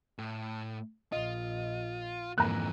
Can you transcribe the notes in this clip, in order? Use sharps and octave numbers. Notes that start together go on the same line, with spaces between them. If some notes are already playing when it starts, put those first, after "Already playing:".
A2
A#1 F4 D#5
F2 G#2 D3 E3 A#3 A#5 F#6